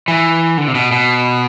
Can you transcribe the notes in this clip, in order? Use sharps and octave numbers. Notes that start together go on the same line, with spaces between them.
E3
D3
C3
B2
B2